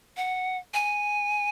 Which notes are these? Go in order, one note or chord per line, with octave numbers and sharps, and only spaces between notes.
F#5
G#5